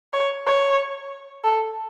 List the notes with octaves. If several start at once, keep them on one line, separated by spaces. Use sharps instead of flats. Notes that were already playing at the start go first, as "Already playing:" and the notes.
C#5
C#5
A4